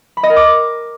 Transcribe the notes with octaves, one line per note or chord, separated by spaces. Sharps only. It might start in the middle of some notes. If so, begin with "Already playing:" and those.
B5
D#5
A#4
D6